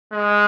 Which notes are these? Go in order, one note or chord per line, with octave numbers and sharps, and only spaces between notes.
G#3